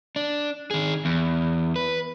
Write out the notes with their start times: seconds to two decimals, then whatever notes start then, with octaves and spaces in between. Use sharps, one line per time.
0.16 D4
0.71 D#3 G#4
1.05 E2
1.76 B4